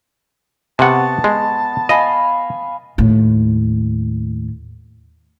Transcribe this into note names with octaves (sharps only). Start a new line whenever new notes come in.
C3 B3 F#5 A5 C#6 D#6
G#3
D#5 F5 G#5 B5
D#2 A2